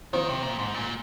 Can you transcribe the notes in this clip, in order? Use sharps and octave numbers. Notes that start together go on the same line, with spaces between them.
D#3 F3 C4 F4 C5
C3
A#2
G#2
A#2